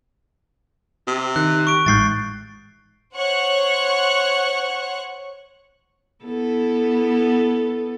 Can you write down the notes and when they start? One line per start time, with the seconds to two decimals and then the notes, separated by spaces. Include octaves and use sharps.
1.07 C3
1.36 D#3 F#6
1.67 C#6 D7
1.86 A1 G#2 G6 A6 C7
3.14 C5 C#5 F#5 C#6 F#6
6.24 B3 E4 A4